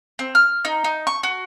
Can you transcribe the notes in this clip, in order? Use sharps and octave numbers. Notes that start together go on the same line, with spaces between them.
C4
F6
D#4
D#4
C#6
F#4